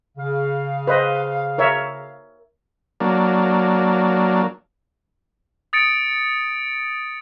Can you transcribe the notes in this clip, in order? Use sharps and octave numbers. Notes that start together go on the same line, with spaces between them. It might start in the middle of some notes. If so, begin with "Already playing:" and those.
C#3 F5
B4 C5 D#5
A#4 C#5 E5
F#3 A#3 D4
D#6 A6 C#7 D7